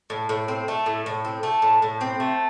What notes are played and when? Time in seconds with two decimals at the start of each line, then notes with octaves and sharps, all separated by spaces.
0.10 A2
0.29 A2
0.48 C4
0.68 A3
0.86 A2
1.06 A2
1.25 C4
1.43 A3
1.62 A2
1.82 A2
2.01 C4
2.20 A3